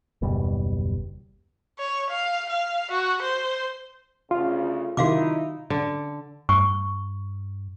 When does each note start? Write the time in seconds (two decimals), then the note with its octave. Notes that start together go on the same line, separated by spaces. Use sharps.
0.22 F#1 D#2 B2 G3
1.79 C#5
2.09 F5
2.50 F5
2.91 F#4
3.22 C5
4.31 D2 C#3 F4
4.97 C3 D#3 D#4 E4 F#4 F5 D6
5.70 D3
6.49 G2 C#6